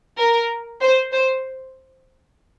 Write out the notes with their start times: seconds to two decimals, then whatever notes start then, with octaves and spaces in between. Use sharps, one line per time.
0.18 A#4
0.81 C5
1.12 C5